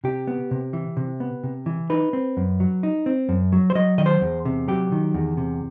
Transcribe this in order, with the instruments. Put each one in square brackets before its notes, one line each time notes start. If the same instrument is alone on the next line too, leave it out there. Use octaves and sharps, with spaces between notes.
[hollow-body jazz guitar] C3 G4
B3
C3
E3
C3
B3
C3
E3
D#4 B4
C4
F#2
F#3
D#4
C4
F#2
F#3
C5
F#3 D#5
D#3 D#5
C5
E2
C3
F#3 G4
D#3
E2
C3